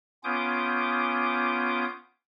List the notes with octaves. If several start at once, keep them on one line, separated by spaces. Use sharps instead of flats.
B3 C#4 F4 D6 D#6 G6